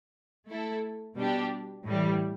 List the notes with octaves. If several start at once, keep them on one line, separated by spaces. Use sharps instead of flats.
A3 E4 A4
B2 G3 D4 G4
A2 E3 G3